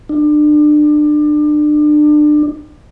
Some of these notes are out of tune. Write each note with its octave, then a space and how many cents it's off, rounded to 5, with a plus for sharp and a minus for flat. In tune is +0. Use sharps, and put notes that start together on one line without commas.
D4 +30